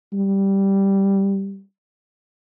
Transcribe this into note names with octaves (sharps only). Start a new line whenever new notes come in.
G3